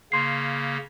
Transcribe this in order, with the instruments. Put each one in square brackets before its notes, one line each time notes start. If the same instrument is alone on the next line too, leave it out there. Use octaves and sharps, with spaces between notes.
[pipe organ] C#3 A#3 [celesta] C6 C7